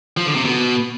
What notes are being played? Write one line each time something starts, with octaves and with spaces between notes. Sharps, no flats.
F3
D3
C3
B2